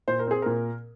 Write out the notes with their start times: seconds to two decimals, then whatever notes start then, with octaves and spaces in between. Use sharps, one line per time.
0.08 A#2 C5
0.19 A#4
0.27 C4 G#4
0.42 A#2 A#4